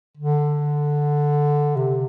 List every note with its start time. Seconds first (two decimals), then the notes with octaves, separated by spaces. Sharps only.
0.17 D3
1.76 C3